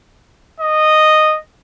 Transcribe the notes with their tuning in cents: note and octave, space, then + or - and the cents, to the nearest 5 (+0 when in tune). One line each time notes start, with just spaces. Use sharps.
D#5 -10